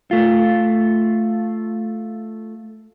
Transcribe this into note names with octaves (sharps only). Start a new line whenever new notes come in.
A3 F4